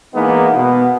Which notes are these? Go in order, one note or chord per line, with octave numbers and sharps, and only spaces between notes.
E3 G#3 A#3 B3 D#4
B2 B3